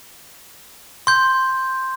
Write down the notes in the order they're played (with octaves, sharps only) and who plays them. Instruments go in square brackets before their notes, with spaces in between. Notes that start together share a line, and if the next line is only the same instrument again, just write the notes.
[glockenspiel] C6 G6